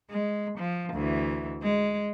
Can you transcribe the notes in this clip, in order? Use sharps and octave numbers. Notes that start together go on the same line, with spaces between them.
G#3
F3
D2 E3
G#3